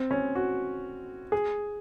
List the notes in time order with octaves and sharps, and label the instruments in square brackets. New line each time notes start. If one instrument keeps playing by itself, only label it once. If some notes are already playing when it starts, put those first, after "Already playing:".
Already playing: [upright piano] C4
C#4
F#4
G#4